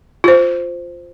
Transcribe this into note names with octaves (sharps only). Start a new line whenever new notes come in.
F4 C5